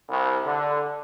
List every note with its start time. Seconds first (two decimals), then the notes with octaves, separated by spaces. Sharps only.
0.10 C2
0.45 D3